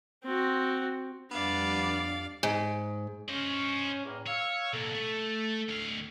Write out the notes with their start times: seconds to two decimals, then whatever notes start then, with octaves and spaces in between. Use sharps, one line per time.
0.24 C4 F#4
1.31 F2 G3 B3 D4 D5 F5
2.43 G#2
3.28 C#4 C5 D#5
4.05 E2 A2 A#3
4.27 C#5 F5 E6
4.73 B2 A#3 A4
4.94 A3
5.69 D2 F5